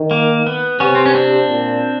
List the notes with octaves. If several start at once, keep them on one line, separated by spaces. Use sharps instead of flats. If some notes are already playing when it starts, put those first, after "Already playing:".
Already playing: D#3
A#3
B3
C3 B3 C#4
C4
C#4
C4 D4
A#2